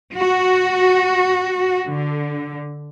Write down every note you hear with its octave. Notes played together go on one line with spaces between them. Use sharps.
F#4
D3